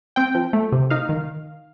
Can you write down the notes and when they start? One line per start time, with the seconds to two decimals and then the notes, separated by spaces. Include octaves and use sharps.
0.16 C4 G5
0.35 F3
0.53 A3
0.72 C3
0.90 D#4 F5
1.09 D#3